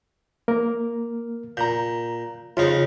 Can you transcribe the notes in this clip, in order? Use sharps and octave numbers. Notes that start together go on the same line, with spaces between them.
A#3 A#4
A#2 A#5 G6
F2 C#3 D#4 F4